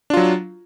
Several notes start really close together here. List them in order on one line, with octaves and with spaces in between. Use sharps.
D4 F4 F#3